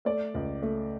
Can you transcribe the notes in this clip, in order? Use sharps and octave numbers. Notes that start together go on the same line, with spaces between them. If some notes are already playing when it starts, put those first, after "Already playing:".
A3 D5
C#2
A3